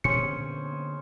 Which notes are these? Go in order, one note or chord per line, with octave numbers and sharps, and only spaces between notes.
A#2 D3 B3 C#4 G#4 C5 C#7